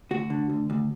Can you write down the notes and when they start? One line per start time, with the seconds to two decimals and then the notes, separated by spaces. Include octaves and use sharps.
0.11 D2 F#4
0.30 D3
0.50 D2
0.70 D2